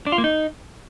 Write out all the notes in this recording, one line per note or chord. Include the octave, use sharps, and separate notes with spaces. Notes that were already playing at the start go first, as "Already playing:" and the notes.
D4
F4
A#3
D#4